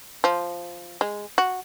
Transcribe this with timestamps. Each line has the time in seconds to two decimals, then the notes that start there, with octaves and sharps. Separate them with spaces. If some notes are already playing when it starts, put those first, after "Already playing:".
0.24 F3
1.01 G#3
1.38 F#4